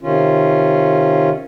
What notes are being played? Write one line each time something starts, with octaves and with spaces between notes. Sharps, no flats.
C3 D#3 C#4 F4